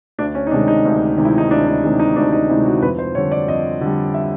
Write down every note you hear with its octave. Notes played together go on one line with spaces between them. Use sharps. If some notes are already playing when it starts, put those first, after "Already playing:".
D2 D4
C#4
D#4
C3 D#3 G#3 D4
D#4
D2
C3 D#3 G#3
E4
D#4
D2 D4
D#4
C3 D#3 G#3 E4
D#4
D2 D4
D#4
C3 D#3 G#3 E4
F#4
F2 B4
C5
D3 G3 C#5
D5
F2 D#5
D3 G3
E5